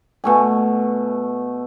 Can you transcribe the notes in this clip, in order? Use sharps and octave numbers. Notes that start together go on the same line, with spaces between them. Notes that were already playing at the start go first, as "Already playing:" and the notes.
B2 A3 G#5